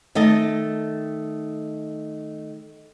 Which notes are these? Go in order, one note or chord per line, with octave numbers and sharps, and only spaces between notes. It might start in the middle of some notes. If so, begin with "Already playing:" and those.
D#3 A3 D#5 A5